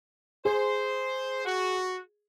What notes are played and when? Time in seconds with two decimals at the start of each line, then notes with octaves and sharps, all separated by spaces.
0.45 G#4 C5
1.45 F#4